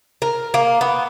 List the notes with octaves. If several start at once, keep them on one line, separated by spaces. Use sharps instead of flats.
A#4
A#3
B3